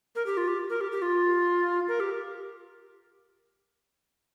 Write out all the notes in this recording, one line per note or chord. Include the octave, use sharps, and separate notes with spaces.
A#4
G4
F4
G4
A#4
G4
G4
F4
A#4
G4